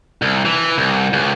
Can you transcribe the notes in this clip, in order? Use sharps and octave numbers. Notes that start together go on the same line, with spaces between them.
C2
E3
C2
C#2